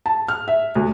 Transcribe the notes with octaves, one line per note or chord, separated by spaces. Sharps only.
A5
F6
E5
D2